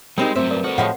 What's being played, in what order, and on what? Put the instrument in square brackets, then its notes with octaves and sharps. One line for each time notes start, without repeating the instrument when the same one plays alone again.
[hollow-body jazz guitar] G3 C4 D#4 [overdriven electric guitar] G#3 [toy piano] A#4
[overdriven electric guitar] G2 F#3 [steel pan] A3 C4 C5 [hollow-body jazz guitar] E5
[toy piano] A#4 [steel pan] B4 D5
[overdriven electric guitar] A3 F#4 [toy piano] A4 C5
[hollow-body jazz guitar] A2 F3 G#3 [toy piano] F#5